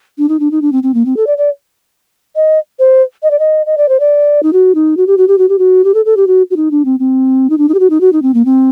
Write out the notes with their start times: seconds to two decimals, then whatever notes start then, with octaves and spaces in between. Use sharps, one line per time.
0.18 D4
0.29 D#4
0.40 D4
0.51 D#4
0.62 D4
0.72 C4
0.83 C4
0.94 A#3
1.05 C4
1.17 A4
1.27 D5
1.38 D5
2.36 D#5
2.79 C5
3.23 D#5
3.31 D5
3.39 D#5
3.66 D#5
3.77 D5
3.89 C5
4.00 D5
4.43 D#4
4.53 F#4
4.75 D#4
4.97 F#4
5.07 G4
5.18 F#4
5.28 G4
5.38 F#4
5.49 G4
5.59 F#4
5.84 G4
5.94 A4
6.05 A4
6.17 G4
6.27 F#4
6.51 F#4
6.56 D#4
6.71 D4
6.85 C4
7.00 C4
7.50 D#4
7.58 D4
7.69 D#4
7.74 G4
7.80 F#4
7.90 D#4
8.01 F#4
8.13 D#4
8.22 C4
8.34 A#3
8.45 C4